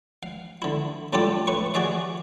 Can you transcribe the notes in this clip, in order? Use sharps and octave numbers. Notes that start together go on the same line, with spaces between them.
F5
D3 E4
A2 G3 D4 F4 G4 A4
A2 B4 C#6
F#4 G#4 D5 E5 F5